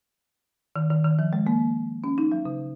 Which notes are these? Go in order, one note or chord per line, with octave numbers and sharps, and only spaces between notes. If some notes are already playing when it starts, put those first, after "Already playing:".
D#3
D#3
D#3
F3
G#3
A#3
C#4
D#4
F#3
C#3